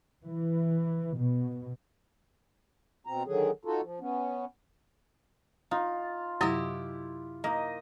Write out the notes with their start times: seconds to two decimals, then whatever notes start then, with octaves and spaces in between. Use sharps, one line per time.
0.23 E3
1.16 B2
3.07 B2 C4 A#5
3.26 D3 D#3 F#3 G#4
3.65 D#4 F4 F#4 A4
3.83 F3
4.00 B3 C#4
5.71 D#4 F4
6.41 F#2 C3 F#3 E4 G4 D#5
7.44 A#3 D#4 D#5